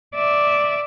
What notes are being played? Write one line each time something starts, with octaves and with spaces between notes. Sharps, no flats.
D5 E5